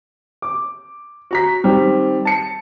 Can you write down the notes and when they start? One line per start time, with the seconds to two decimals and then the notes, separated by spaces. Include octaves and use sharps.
0.42 D6
1.31 F#4 A#5 B6
1.64 D#3 G3 C4
2.25 A5 C#7